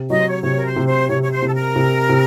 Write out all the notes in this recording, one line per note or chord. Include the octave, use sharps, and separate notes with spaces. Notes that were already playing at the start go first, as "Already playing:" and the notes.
Already playing: C3
F#3 D#5
C5
C#5
C3 C#5
A#4
C5
C3
C5
C3 C#5
C#5
C5
C3
A4
A#4
C3
C3